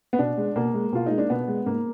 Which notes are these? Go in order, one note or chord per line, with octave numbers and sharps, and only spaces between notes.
B3
B2 D4
G#3
B2 A#3
G#3
B2 F4
G#3 D#4
D4
B2 B3
G#3
G#2 A#3